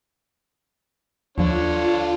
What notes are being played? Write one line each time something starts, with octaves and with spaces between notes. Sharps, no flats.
D#2 D3 F3 D4 F4 C#5